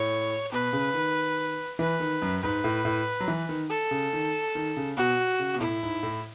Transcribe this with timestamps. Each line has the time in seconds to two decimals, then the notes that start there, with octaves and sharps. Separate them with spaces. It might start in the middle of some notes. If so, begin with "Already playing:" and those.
Already playing: A2 C#5
0.52 B2 B4
0.73 C#3
0.94 D#3
1.79 E3 B4
2.00 D#3
2.22 F#2
2.42 G#2 B4
2.64 A2
2.85 A2
3.20 F#3
3.28 E3
3.49 D#3
3.70 A4
3.91 C#3
4.13 D#3
4.55 D#3
4.77 C#3
4.97 B2 F#4
5.39 C#3
5.55 B2
5.60 A2 E4
5.83 G#2
6.03 A2